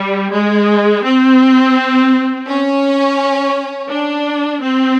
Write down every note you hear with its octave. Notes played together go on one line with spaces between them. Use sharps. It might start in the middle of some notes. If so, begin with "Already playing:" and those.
Already playing: G3
G#3
C4
C#4
D4
C4